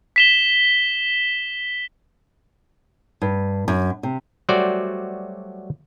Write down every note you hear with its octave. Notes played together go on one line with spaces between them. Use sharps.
B6 E7 G7
G2
F#2
C3
F#3 G3 A3 F#4 C5 D5